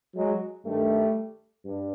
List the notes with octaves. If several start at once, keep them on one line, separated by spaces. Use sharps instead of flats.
F#3 G#3
G2 D#3 G3 A3
G2